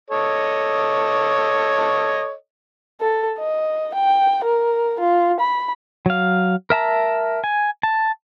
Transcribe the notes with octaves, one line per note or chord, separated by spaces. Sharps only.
A4 C#5 D#5
A4
D#5
G5
A#4
F4
B5
F#3 F5
A#4 E5 A5 A#5
G#5
A5